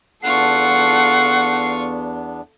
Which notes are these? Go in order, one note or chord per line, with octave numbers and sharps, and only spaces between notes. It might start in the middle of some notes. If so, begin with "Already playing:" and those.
E2 B3 D4 F4 A4 F#5 C#6 C7